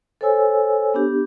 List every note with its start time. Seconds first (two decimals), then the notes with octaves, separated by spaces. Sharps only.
0.21 A4 C5 C#5 G#5 E6
0.94 B3 D4 G4